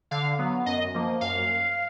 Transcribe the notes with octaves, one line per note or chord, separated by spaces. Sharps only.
D3 F5
F#3 B3
F#2 D#5
F3 A#3
F#2 F5